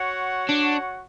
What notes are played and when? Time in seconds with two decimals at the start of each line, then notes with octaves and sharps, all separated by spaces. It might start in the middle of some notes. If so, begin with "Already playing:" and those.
Already playing: F#4 C#5 F#5
0.49 D4